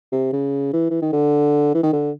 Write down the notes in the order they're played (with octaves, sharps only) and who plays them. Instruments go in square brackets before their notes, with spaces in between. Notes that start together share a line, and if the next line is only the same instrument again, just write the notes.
[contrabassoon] C3
C#3
E3
E3
D#3
D3
E3
D#3
D3